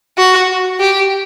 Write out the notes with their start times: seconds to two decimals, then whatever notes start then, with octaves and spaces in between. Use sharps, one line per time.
0.18 F#4
0.80 G4